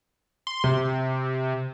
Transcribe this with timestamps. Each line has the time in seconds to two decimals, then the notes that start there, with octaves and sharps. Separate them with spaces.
0.47 C6
0.64 C3